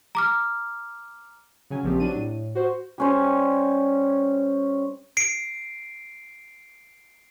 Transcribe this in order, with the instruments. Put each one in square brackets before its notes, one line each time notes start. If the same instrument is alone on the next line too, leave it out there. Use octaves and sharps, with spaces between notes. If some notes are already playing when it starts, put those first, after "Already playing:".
[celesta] A#5 D6 F6
[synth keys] C#3 F#3 G#5
A#1 F3 C4 G4
F#3 D4 D#7
A2
F#4 C5
[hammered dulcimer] G3 C#4 C5
[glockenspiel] C7 D7